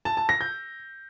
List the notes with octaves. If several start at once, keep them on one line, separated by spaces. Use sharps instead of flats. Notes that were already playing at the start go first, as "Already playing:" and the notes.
A5
A5
A#6
G6